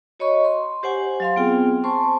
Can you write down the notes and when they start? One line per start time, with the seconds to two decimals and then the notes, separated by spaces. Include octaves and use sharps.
0.20 F#4 C#5 D#5 B5 C#6
0.45 C6
0.83 G4 C5 F#5 G#5
1.20 F#3 F5 C6
1.36 B3 C4 F4 G#4 G5
1.84 C5 G#5 A5 C6 C#6